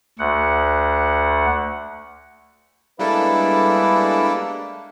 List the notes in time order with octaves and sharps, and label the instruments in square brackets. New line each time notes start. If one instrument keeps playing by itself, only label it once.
[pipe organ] D2 F#5
[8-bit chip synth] G3 D4 A4 [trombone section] G#3 B3 B4 [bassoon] A#3 [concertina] E4